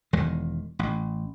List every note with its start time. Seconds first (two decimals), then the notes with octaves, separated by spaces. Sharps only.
0.13 E1 E2 D#3 G#3
0.79 A1